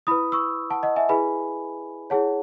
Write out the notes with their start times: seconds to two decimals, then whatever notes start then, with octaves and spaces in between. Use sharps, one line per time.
0.07 E4 B4 B5 D#6
0.32 C#6 E6
0.70 F#5 A5
0.83 D#5 F#5
0.96 E5 G#5
1.09 E4 G#4 B4 G#5 B5
2.10 E4 G#4 C#5 F#5 A5